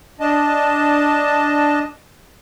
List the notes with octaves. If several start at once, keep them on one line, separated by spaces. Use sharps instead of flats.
D4 D#5 A5